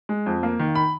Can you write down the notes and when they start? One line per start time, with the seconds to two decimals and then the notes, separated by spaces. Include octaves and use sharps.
0.09 G#3
0.26 F2
0.43 A#3
0.59 D#3
0.75 B5